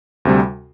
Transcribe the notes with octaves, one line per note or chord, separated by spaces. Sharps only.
D2 C3 G3